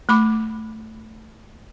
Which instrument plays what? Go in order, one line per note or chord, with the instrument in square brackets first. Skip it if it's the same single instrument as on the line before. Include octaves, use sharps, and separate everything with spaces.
[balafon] A3 B5 D6